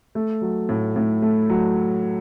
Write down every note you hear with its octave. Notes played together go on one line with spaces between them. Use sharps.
A3
F#3
A2
A2
A3
F#3